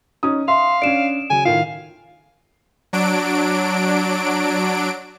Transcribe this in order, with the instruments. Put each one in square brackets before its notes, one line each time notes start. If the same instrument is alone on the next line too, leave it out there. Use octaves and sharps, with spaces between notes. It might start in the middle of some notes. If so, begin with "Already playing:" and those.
[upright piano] C#4 D#4 D#6
[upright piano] E5 [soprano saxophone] F5 [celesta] C6
[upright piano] C#4 D4 [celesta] D7 E7
[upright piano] C#3 F#3 [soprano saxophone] G#5
[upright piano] A2 D#3 F4 [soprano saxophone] F5
[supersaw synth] F#3 D4 D7